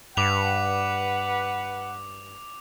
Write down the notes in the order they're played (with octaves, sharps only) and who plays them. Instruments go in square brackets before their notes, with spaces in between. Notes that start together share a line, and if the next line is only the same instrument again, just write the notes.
[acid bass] G2 [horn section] B4 F#5 [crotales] D6 F7